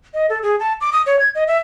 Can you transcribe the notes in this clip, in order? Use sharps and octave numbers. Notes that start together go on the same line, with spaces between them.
D#5
A4
G#4
A5
D6
D#6
C#5
G#6
D#5
E5